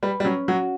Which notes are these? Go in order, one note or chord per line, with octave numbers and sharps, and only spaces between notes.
G3 B4
G3
F#3 C#4
F#3 F#4